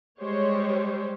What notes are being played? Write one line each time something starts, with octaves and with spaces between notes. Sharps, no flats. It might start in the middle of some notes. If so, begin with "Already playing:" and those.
G3 G#3 G4 C5 C#5